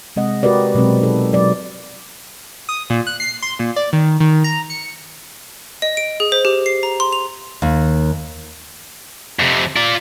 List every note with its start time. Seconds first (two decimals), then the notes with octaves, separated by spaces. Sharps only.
0.16 C3 G#3 C4 D#5 F#5
0.43 F#4 G4 A#4 B4 D5
0.75 B2 F#3 G#3 C4 B4
1.01 D#4 A4
1.33 F#3 D5
2.69 D#6
2.90 A#2
3.07 F#6
3.20 C7
3.42 C6
3.59 A#2
3.76 D5
3.93 D#3
4.20 D#3
4.44 A#5
4.70 C#7
5.82 D#5
5.97 D7
6.20 G#4
6.32 C5
6.45 G4
6.66 C7
6.83 A#5
7.00 C6
7.13 F7
7.62 D#2
9.39 F2 C3
9.76 F4 D5